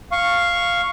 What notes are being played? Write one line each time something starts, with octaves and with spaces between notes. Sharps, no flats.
F5 C#6